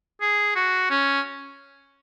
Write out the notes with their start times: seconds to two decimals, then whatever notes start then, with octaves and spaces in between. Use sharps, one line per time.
0.21 G#4
0.56 F#4
0.90 C#4